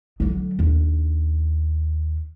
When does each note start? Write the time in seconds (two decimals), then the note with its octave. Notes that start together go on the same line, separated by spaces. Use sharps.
0.20 D3 F#3
0.59 D#2 D4